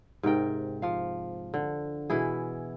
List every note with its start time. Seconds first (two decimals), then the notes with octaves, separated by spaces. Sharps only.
0.23 G#2 C3 A#4 G5
0.82 F3 F5
1.54 D3
2.10 B2 E3 E4 G#4